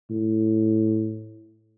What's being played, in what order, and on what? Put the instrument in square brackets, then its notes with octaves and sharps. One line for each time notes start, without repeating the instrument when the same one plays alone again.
[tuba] A2